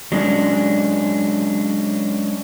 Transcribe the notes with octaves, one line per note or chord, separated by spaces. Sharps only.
F#3 G#3 C#4 D4